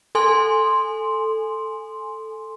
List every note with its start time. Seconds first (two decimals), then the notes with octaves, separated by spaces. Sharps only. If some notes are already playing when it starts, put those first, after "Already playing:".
0.15 A4 G#5 C6